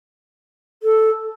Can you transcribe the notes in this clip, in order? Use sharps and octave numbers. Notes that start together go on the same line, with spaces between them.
A4